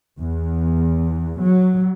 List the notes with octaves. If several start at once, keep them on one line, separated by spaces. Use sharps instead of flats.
E2
F#3